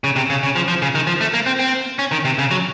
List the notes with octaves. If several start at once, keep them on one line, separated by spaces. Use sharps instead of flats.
C#3
C3
C#3
C#3
F3
F3
C#3
D#3
F3
A3
A#3
C4
C4
C#4
D#3
C3
C#3
F#3